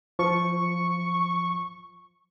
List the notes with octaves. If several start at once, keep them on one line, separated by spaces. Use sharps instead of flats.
F3 C#6